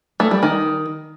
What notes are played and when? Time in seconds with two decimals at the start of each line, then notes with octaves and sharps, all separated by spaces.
0.20 A3
0.31 G3
0.43 D#3